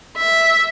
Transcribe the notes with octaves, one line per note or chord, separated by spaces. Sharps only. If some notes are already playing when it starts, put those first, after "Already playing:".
E5